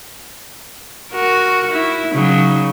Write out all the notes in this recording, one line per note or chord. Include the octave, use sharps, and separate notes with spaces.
F#4 A#4
E4
C#3 F#3 D#4